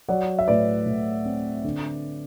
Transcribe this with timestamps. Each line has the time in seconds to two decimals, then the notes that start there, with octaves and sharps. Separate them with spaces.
0.09 F#3 D5 F#5
0.39 E5
0.48 A2 B4 D5
0.86 A2
1.25 C4
1.64 D3